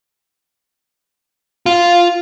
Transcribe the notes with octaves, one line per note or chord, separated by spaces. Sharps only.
F4